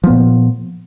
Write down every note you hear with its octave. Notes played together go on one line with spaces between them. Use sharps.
A#2 F3 B3